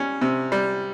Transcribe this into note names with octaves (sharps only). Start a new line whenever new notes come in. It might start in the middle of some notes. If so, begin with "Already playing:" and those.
Already playing: G3 C#4
C3
G3